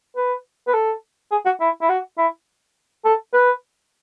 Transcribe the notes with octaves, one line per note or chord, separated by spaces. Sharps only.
B4
B4
A4
G#4
F#4
E4
E4
F#4
E4
A4
B4